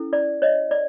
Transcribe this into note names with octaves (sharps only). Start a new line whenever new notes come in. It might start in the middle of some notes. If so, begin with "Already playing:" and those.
Already playing: C#4 E4 A4
D5
C#5 D#5
D5